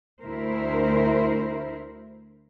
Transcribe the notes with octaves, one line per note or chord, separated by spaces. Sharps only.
D2 E4 A#4 C5